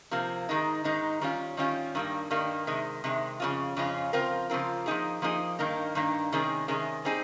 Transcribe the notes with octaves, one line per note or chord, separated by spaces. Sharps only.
C3 F3 A#3
G#2 D#3 G#3 D#4
G#2 D#3 G#3 D#4
D#3 G3 C#4 F4
D#3 G3 C#4 F4
G2 D#3 G3 A#3
G2 D#3 G3 A#3
C3 D#3 G#3
C3 D#3 G#3
F2 C#3 G#3 C#4 F4
F2 C#3 G#3 C#4 F4
C#3 F3 C4 F4 A#4
C#3 F3 C4 F4 A#4
F3 A#3 D#4 G#4
F3 A#3 D#4 G#4
G2 D#3 A#3 D#4
G2 D#3 A#3 D#4
C3 D#3 G#3 C#4 G#4
C3 D#3 G#3 C#4 G#4
G3 C4 D#4 G#4